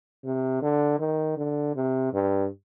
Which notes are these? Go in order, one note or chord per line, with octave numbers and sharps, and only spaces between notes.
C3
D3
D#3
D3
C3
G2